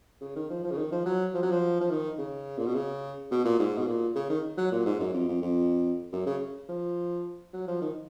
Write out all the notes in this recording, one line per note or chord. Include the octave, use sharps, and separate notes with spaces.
C#3
D#3
F3
F3
C#3
D#3
F3
F#3
F3
F#3
F3
F3
D#3
C#3
A#2
B2
C#3
B2
A#2
G#2
B2
A#2
C#3
D#3
F#3
A#2
G#2
F#2
F2
F2
F2
F#2
C#3
F3
F#3
F3
D#3